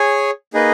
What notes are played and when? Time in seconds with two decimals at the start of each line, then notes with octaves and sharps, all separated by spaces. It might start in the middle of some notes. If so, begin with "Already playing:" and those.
Already playing: G#4 C#5 G#5
0.54 A#3 D#4 G#4 B4 D#5